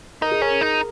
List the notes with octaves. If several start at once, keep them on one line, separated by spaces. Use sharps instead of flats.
D#4 A#4
G#4
C#4 A#4
D#4